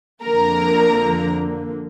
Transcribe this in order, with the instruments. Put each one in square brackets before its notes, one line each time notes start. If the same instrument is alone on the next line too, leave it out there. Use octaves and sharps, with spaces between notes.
[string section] F2 D3 F3 A#3 A#4 A#5